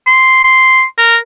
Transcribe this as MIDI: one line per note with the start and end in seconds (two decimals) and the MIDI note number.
0.07 0.44 84
0.44 0.83 84
0.98 1.16 70